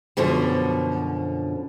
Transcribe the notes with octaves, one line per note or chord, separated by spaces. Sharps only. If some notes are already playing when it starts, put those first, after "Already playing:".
F#2 B2 D3 F3